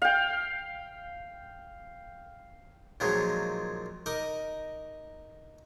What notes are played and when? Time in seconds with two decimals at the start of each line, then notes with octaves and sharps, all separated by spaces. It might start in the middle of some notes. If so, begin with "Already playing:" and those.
0.02 F5 G5
3.00 A#2 D#3 F3 F#3 G#3
4.06 D#4 A#4 D#5 D6